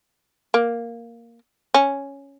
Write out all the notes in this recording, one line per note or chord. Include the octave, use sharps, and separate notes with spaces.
A#3
C#4